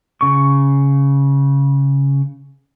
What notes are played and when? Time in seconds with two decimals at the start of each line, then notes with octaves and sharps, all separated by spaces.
0.21 C#3 C#6